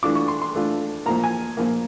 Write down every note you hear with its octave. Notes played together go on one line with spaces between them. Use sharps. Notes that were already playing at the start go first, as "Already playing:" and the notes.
E3 A3 D4 F4 D6
C#6
C6
C6
E3 A3 D4 F4
A#2 F3 A#3 A#5
G#5
A#2 F3 A#3